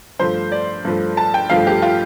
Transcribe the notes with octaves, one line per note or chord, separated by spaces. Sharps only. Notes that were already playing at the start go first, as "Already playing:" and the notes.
G2 F3 A3 C5
D5
G2 F3 A3
A5
G5
G2 F3 A3 F5
G4
F4